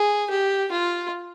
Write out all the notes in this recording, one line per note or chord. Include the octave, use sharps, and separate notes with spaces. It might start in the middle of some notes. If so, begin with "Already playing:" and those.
Already playing: G#4
G4
F4